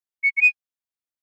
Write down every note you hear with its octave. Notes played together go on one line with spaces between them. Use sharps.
C#7
C#7
D#7